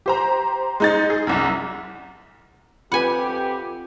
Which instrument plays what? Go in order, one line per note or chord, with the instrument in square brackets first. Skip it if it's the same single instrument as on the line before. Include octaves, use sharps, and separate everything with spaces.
[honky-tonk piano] G4 C5 A#5
G#3 D#4 A6
G#4
C2 F#2
[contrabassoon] F2 [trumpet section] G4 [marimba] B4 B5 [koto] F#5 G#5